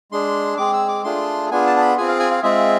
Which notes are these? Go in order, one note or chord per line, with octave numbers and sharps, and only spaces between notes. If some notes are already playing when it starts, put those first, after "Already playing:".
G#3 D4 G#4 C6
G#3 C4 G#4 D6
E6
D6
A3 D4 F4 G#4 C6
B3 D4 F4 G#4 G#5
A5
A5
B5
C4 F4 G#4 G#5
F5
G#5
F5
G#3 C4 F4 G#4 E5